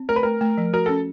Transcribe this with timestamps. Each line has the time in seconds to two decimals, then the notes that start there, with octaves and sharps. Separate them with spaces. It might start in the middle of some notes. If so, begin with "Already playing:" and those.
Already playing: C4
0.09 A3 A#4
0.16 B4
0.23 A3 A#4
0.41 A3
0.58 F3
0.73 F#4 A#4
0.86 C#4 A4